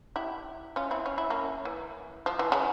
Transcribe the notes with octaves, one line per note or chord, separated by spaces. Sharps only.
E4 G4
C#4 F4
C4 E4
C#4
E4
A#3 C#4
E3
F3
E3
C#3